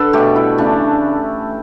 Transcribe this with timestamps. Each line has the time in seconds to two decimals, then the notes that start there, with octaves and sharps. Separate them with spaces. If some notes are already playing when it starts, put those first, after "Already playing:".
Already playing: D3 A4 B4
0.13 B2 A3 G4
0.36 E4
0.58 C#3 E3 A3 D4